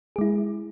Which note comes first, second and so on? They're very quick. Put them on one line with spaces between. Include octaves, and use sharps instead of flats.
G#4 G#3 E4